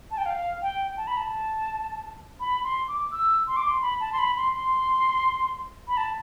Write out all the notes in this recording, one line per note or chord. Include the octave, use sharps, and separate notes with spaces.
A5
G5
F5
G5
A5
B5
A5
B5
C6
D6
E6
C6
D6
C6
B5
A5
C6
B5
C6
C6
B5
A5